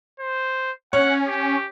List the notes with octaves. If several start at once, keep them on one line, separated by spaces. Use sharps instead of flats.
C5
C#4 C#5 F#5
G4